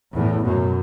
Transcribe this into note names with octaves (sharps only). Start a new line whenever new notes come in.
E2 A2
F#2 B2